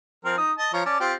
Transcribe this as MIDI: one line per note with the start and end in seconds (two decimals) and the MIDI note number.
0.25 0.38 53
0.25 0.38 60
0.25 0.38 70
0.38 0.52 63
0.38 0.52 87
0.58 0.69 75
0.58 0.69 81
0.74 0.83 53
0.74 0.83 73
0.74 0.83 82
0.86 0.99 61
0.86 0.99 74
0.86 0.99 81
1.00 1.14 60
1.00 1.14 65
1.00 1.14 67